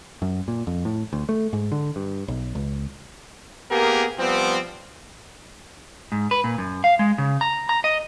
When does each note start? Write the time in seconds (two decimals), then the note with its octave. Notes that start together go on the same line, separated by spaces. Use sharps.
0.22 F#2
0.48 A#2
0.67 F2
0.85 A2
1.13 D2
1.29 A3
1.53 G#2
1.72 D3
1.96 G2
2.28 B1
2.55 C#2
3.70 A#3 B3 G4 G#4 A#4
4.18 F3 G3 B3 C4
6.12 G#2
6.31 B4
6.44 A#2
6.58 F#2
6.84 F5
6.99 G#3
7.18 C#3
7.41 A#5
7.69 A#5
7.84 D#5